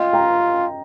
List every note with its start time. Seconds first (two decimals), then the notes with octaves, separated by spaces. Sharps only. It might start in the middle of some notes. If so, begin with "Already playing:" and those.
Already playing: F4 D#5 G5
0.13 G5 A#5